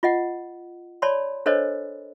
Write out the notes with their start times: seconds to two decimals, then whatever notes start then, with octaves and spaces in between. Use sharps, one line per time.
0.03 F4 D#5 F#5
1.02 C#5 D5 A5 B5 C6
1.46 D4 A4 A#4 C5 C#5 D#5